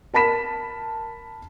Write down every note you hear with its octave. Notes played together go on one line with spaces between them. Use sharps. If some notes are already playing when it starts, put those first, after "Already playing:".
A#4 A5 B5 B6 E7